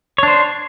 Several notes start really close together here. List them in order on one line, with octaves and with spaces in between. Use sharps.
C#5 D4 C5